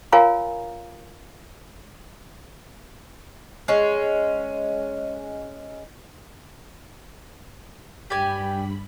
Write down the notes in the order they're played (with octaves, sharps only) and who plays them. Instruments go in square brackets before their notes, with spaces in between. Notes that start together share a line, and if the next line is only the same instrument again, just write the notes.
[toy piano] F4 A#4 C#5 F5 G#5 A#5
[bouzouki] G#3 C#4
[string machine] G2 B5 [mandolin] G4 D5 G#5